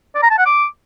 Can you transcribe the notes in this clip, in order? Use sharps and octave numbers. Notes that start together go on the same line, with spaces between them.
D5
A#5
A5
F#5
D6